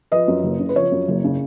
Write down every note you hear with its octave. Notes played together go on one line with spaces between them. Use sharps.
F3 B4 D#5
F#2
F#1
C#3
B4
F3 C#5
F#2
F#1
C#3